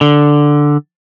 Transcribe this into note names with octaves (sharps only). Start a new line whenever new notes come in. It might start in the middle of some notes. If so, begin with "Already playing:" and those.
D3